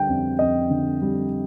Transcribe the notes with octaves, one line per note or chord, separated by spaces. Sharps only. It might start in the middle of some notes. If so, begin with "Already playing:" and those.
Already playing: D3 G3 G5
F2
F2 D#5
D3
G3